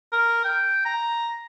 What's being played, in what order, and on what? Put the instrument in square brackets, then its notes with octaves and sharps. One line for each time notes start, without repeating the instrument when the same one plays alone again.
[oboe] A#4
G5
A#5